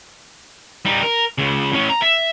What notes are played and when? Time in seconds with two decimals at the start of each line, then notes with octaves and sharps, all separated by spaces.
0.85 G3 D#4
1.03 A#4
1.38 C#2 C#3
1.73 A2 C#4
1.89 A#5
2.02 E5